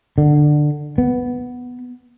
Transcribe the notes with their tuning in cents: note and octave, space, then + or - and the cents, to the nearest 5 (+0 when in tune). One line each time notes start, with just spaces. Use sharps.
D3 +15
B3 +0